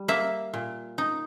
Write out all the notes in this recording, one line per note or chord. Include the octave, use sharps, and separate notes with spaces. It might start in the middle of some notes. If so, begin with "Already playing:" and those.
Already playing: G3
A#3 E5
A#2
D#4